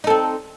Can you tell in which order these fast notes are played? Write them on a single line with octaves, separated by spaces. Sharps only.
D#4 A4 C4